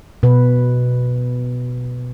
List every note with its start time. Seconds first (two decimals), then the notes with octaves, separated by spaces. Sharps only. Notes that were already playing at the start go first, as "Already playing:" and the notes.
0.23 B2 B4